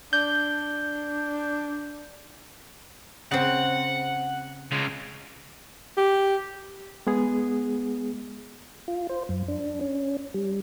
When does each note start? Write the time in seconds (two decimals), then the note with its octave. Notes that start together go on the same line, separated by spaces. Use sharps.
0.13 D4 G6
3.31 C#3 C4 F#5
4.72 C#3 G#3
5.97 G4
7.07 G#3 B3 G#4
8.88 F4
9.09 C5
9.29 F#2
9.48 D4
9.81 C#4
10.34 G3